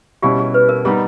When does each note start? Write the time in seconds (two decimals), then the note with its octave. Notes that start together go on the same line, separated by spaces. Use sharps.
0.22 B2 G3 C#4 E4 G4
0.39 G#4
0.54 B4
0.69 A#4
0.85 G3 B3 D#4 G#4